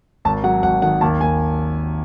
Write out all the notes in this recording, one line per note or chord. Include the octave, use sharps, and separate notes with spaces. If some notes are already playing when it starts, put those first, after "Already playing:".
G#1 A5
F#3 F#5
G#1 F#5
D#3 F#5
D#2 A5
D#2 G#5